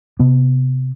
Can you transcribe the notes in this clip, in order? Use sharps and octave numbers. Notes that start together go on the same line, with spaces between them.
C3 B3